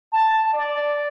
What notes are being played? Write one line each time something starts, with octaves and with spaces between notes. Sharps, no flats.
A5
D5